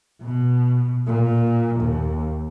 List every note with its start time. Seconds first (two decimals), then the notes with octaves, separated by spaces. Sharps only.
0.23 B2
1.07 A#2
1.80 D#2